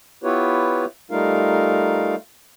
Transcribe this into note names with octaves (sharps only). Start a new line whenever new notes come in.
B3 E4 F4 G4 B4 C#5
G3 A3 D#4 F4 A#4 F5